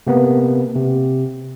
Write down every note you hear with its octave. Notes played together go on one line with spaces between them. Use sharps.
C3 A#3 B3
C3